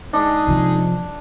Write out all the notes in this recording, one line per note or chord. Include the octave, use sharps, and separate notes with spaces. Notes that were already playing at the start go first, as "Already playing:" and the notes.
G#3 D4 D#4 G#4
C3 F3